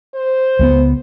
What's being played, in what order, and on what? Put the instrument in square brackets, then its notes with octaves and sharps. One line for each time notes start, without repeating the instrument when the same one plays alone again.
[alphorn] C5
[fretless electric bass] C#2 A3 B3